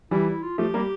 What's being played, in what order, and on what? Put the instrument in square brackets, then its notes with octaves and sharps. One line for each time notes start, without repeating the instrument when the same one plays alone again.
[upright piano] E3 G3 [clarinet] E4
[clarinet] E4
F4
[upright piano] F3 A3 [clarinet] G4
[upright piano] G3 A#3